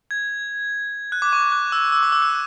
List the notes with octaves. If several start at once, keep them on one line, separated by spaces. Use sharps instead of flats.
G#6
F#6
D6
C#6
F#6
E6
E6
D6
E6
F#6